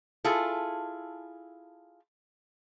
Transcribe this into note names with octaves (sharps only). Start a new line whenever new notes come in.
E4 F4 G#4 A4